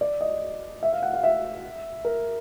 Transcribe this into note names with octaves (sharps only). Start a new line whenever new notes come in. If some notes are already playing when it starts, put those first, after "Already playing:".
D5
D#5
E5
F5
F#5
F5
E5
A#4